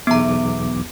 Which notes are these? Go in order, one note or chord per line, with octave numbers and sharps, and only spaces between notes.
B1 E2 B3 A#5 D6